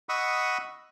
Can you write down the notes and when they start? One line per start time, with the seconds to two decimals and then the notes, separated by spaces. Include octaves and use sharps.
0.09 D#5 F#5 B5 C#6 D#6 E6